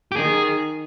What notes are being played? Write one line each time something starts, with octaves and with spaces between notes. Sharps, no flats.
G4
D#3 G#4